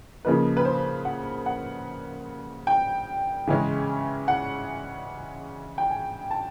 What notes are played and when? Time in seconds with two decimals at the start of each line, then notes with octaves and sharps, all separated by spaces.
0.25 C#3 F3 A#3 D#4 B4
0.57 B4
0.65 C5
1.05 F#5
1.46 F#5
2.67 G5
3.47 C#3 E3 G#3 C#4
4.28 F#5
5.78 G5
5.91 G#5
6.31 A5